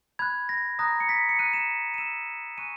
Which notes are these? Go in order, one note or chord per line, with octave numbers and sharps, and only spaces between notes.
B5 F#6 G#6
A#6
A#5 D#6 F#6 A#6
C#7
B6
C#7
A#5 D#6 F#6 D#7
E7
D#7
A#5 E6 E7
G#5 C#6 F#6 D#7